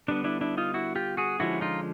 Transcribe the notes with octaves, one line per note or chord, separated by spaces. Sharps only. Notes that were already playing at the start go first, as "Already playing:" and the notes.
D3 G3 B3 D4
D4 E4
D4 E4
D#4 F4
E4 F#4
F4 G4
F#4 G#4
D3 F3 G#3 C#4 E4 F#4
D#4 F4